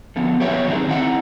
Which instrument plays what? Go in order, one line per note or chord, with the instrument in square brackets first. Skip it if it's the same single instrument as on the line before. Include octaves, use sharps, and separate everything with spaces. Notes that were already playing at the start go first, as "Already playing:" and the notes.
[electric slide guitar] D3 F3 B3
F#3 G4 B4 C#5 E5
D#3 F#3 C4 D4 D#4 G#4
C4 D#4 E4 F#5